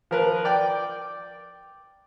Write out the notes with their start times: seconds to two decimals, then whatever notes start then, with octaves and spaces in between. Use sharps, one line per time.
0.11 F3 A#4 B4
0.45 D5 G5 D6